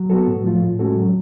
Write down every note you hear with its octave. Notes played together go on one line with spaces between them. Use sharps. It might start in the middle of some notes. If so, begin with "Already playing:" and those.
Already playing: F#3
B3 F#4 A4
A2
F3 A3 F4
A2
G#3 C#4 F#4 A4
F#3